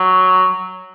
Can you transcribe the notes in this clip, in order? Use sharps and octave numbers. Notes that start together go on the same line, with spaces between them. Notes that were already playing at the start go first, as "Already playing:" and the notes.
Already playing: F#3